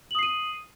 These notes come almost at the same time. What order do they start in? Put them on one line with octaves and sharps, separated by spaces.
F#7 D#6 C7 D#7